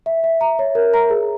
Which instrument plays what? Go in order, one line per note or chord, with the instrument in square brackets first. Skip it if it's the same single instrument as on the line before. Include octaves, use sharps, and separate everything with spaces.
[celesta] E5
E5
A#5
C#5
A#4
A#5
G#4